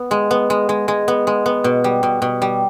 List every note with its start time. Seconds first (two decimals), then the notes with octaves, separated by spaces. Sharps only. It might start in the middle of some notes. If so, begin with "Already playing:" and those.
Already playing: B3
0.11 G#3
0.31 B3
0.50 G#3
0.69 G#3
0.88 G#3
1.08 B3
1.27 G#3
1.46 B3
1.64 B2
1.84 G3
2.03 B2
2.22 B2
2.42 G3